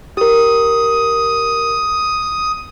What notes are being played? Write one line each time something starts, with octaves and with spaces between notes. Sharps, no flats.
G4 A#4 D#6